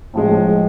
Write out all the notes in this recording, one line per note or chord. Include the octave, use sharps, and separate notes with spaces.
A2 F3 G#3